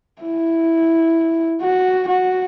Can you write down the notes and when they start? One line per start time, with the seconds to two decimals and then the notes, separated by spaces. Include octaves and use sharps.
0.22 E4
1.62 F#4
2.08 F#4